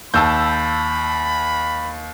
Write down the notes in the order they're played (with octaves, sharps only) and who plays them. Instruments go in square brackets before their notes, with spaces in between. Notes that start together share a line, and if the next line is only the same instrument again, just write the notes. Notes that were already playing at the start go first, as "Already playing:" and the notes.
[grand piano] D#2 [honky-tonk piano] A5 E6 G6 [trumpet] B5